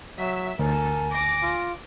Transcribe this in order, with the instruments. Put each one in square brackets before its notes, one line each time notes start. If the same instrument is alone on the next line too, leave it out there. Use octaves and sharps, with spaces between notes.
[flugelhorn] F#3 [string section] E5
[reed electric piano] D2 [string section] A4 [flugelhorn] A#4 [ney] G#5
[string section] D6 A#6
[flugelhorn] F4